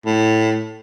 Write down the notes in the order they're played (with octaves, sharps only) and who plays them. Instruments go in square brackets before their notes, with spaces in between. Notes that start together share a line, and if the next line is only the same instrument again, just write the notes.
[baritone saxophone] A2